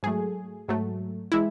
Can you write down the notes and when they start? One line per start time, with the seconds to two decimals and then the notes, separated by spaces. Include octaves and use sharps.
0.03 G#2 F#3 A3 G#4
0.68 G#2 F#3 A3
1.32 E3 G#3 E4